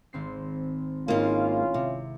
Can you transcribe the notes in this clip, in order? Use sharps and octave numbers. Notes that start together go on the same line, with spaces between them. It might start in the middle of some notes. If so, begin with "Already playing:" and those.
G#1 C4 C7
G#2 A#3 C#4 E4 F4 F5 D#7
C3